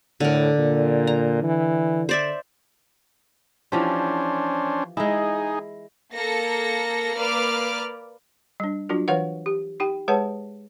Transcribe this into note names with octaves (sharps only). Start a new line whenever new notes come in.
A2 D3 A#4
A#2
A#5
E3
C5 D5 E5
E3 F3 C#4 D4 G4 C5
G#3 D#4 E4 G#4
A#3 A4 A#6 C#7
A#3 B4 D5 D6 F6
G3 D4
F#3 D4 F4 F#4 A#4
E3 A#4 B4 C#5 F5 F#5
G4
D#4 G4 G5
G#3 G#4 B4 C#5 F#5 A5